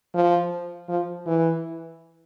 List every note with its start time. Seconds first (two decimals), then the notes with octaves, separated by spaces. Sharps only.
0.15 F3
0.89 F3
1.27 E3